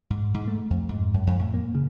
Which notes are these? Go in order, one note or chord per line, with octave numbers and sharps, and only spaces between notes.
G#2
G#2
A3
F2
G#2
F#2
F2
A2
A#3
C#3